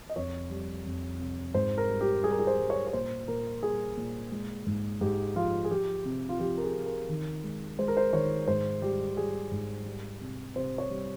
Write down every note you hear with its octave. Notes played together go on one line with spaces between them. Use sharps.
D#5
F2 C#5
G3
F2
C3
G#2 C5
A#4
G3
G4
G3 G#4
A#4
G#4
C5
G3
C#5
C#5
A#2 C5
A#2 A#4
G3 G#4
A#2
G#3
G#2
G#2 G4
F3 F4
G#4
F3 G4
C3
F4
F3 G4
A#4
G#4
C3
A#4
D#3
G#3
G#3 C5
A#4
C5
D#3 C#5
G#2 C5
G3 G4
G3 G#4
G#2
G3
C3
C3 C5
C#5
G3